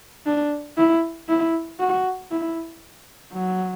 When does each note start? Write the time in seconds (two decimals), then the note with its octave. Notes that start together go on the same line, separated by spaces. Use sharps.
0.26 D4
0.78 E4
1.29 E4
1.80 F#4
2.31 E4
3.33 F#3